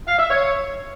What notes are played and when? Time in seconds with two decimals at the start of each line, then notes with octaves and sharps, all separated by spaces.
0.07 F5
0.19 E5
0.30 C#5